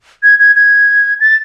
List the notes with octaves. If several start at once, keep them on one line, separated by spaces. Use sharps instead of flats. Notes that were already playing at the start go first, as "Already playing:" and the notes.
G#6
G#6
G#6
A6